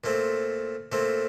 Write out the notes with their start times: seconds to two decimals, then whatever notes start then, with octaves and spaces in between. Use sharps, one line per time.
0.04 A#2 A3 C4
0.92 A#2 A3 C4